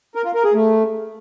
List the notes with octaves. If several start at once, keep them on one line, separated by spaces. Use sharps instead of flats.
A#4
F4
A#4
G#4
A3